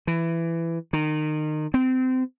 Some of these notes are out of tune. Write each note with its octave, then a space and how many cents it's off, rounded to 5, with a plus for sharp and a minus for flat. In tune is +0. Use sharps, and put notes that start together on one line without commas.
E3 +15
D#3 -25
C4 -25